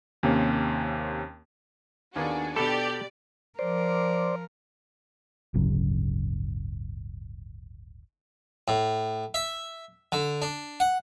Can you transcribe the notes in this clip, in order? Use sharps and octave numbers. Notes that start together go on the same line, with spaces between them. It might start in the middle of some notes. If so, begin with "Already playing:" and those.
D#2 C3 A#3 C#4
D#2 A#3 B3 D4 F#4 G#4
B2 D4 G4 A4 D5 B5
F3 A#4 C5 D5
D1 G1 C#3 F#3
A2
E5
D3
D4
F#5